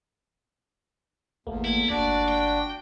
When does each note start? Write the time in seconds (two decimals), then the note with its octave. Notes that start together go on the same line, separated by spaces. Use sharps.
1.47 G#1 E2 A3 A#3
1.65 E4
1.90 G1 D4 F#4 D5
2.29 G5